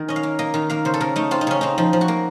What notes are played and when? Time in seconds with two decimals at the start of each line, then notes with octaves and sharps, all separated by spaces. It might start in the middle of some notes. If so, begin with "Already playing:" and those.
Already playing: D#3
0.08 C#4 D#5
0.16 F5
0.23 A#3
0.39 A#3 D#5
0.54 D#3 F5
0.70 A#3 F5
0.85 C#3 C5
0.94 A4
1.00 C#3 A#4
1.16 A3 D#4
1.31 C4 F4
1.41 D#4
1.47 C#3 C#4
1.61 C4 D#4
1.78 F3 D#4
1.93 F3
2.01 F#4
2.08 A#3